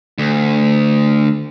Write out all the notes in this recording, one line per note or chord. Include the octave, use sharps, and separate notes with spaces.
D2